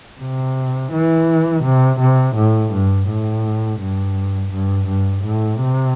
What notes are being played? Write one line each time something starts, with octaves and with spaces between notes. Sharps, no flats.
C3
E3
C3
C3
A2
G2
A2
G2
G2
G2
A2
C3